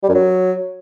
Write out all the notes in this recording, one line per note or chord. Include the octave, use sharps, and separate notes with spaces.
G3
F#2
F#3